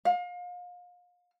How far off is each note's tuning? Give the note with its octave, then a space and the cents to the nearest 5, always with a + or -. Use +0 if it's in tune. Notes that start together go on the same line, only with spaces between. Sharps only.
F5 +35